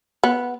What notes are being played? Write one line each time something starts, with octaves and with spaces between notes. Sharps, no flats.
B3